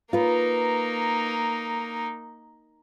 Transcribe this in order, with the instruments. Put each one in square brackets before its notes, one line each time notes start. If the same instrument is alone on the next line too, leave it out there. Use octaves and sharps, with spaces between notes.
[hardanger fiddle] A#3 D#4 [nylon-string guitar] F4 B4